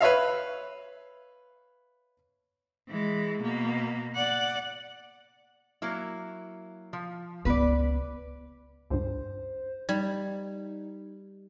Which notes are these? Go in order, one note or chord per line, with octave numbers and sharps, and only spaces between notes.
B4 C#5 E5 F5
E3 G#3
B2 A#3
D5 F#5
F#3 A#3 E4
F3
C#2 B3 B4 D5
C#2 G2 C5
G3 D#4 G#6